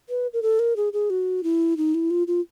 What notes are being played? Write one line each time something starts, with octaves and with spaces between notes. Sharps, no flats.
B4
A#4
A4
A#4
G#4
G#4
F#4
E4
D#4
E4
F4
F4